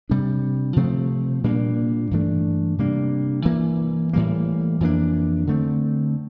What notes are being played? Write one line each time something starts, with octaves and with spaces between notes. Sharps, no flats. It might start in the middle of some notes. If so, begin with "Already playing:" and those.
C3 G3 D4
C3 F3 A3 C4
A#2 G3 A#3 D4
G2 E3 A3 D4
C3 G3 A#3 D4
G2 E3 A#3
A2 E3 G3 A#3
F2 E3 A#3 D4
D3 A3 C4